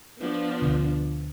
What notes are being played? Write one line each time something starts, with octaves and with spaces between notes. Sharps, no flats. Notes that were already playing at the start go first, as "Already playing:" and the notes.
F3 B3 D4
D2 B2 D3